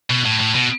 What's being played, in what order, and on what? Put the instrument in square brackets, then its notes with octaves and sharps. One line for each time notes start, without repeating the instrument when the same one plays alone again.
[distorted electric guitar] B2
A2
A2
B2